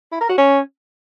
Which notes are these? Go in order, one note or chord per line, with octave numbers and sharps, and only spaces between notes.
E4
A#4
F#4
C#4